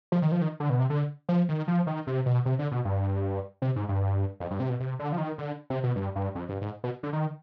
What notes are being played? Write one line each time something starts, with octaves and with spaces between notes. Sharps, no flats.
F3
D#3
F3
D#3
D3
B2
C3
D3
F3
D#3
F3
D#3
C3
B2
C3
D3
B2
G2
C3
G#2
G2
F2
G2
C3
B2
C3
D3
F3
D#3
D3
C3
B2
G2
G2
F2
G2
G#2
B2
D3
D#3